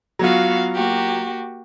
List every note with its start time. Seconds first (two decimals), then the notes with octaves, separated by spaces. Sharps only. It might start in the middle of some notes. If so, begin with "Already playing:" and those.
0.19 F#3 B3 F4 F#4 F5
0.74 A#3 F#4 G4